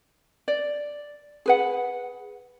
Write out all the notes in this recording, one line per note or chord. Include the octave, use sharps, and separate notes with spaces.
D5
G#4 B4 F#5